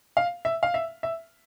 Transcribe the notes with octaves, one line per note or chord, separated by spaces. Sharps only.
F5
E5
F5
E5
E5